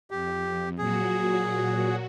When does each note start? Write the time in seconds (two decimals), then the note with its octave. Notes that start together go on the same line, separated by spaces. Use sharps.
0.11 F2 G4
0.78 A#2 F#3 F#4 G#4